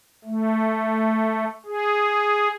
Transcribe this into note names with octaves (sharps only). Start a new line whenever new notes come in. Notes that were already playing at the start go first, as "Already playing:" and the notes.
A3
G#4